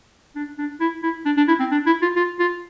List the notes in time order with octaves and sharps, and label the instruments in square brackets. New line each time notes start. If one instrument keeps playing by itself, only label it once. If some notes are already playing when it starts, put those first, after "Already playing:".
[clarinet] D4
D4
E4
E4
D4
D4
E4
C4
D4
E4
F4
F4
F4